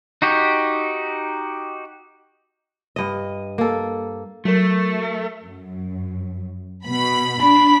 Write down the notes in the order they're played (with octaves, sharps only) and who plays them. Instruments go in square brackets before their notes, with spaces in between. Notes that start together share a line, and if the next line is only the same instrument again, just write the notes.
[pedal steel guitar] D#4 F#4 G4
[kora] G2 D#5
A#3 A4
[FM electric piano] F#3 A#4 [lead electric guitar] A3
[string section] F#2
B2 B5
[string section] D4 [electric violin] B5